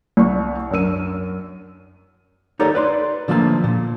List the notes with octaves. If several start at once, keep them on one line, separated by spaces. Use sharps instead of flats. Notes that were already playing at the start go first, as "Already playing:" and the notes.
C2 D5 C#6
F#2 D4 A#4 E6 D#7
D#4 G4 A4 A#4 C#5 D5
B4 D5 C6
D3 F3 A3 A#3 A5
A#2